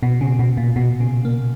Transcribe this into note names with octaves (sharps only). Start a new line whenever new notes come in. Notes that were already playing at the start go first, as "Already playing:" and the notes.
B2
C#3
B2
A#2
B2
C#3
A#3